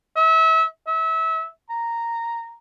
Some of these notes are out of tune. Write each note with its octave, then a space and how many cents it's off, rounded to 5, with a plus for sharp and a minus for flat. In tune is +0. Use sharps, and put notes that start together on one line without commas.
E5 -30
E5 -30
A#5 -5